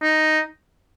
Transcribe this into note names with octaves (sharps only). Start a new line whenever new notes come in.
D#4